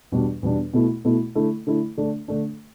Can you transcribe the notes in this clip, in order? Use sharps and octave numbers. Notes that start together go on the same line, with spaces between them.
E2 B2 G3 D4
E2 B2 G3 D4
B2 A3 E4
B2 A3 E4
D3 A3 E4
D3 A3 E4
D3 A3 D4
D3 A3 D4